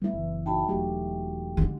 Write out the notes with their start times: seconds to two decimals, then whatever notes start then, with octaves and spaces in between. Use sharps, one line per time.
0.02 G3 A3 B3 E4
0.13 F#1 E3
0.46 D#4 F#4 G5 A5 B5
0.68 E1 F#3 A3 G4 G5
1.57 D3 G#3